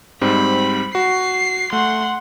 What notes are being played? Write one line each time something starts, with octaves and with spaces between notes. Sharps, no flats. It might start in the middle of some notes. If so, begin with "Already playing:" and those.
G#2 G3 C4 B5
F#4 C7
A3 F#5 C6